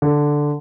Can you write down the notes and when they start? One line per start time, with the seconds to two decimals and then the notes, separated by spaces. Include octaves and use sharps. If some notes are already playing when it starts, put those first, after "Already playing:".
0.02 D3